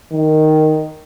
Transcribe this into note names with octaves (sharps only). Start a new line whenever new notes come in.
D#3